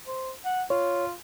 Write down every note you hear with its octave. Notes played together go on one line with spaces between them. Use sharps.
C5
F#5
F4 C#5